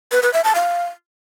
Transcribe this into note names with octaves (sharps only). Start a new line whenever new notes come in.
B4
B4
E5
A5
F5